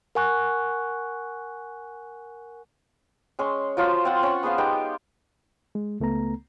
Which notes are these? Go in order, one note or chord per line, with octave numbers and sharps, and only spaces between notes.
A#4 F#5 G#5 C#6 F#6
G#3 C#4 C6
F3 F#3 F4 C5
C4 F4 F#5
C#4 C#6
B3 G#4 C5 F5
G#3 B3 D#4 G4
G#3
C#2 A3 B3 A#5